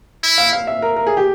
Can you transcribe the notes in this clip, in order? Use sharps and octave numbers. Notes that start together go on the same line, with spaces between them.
E4
F5
F5
E5
A#4
A#4
G#4
G4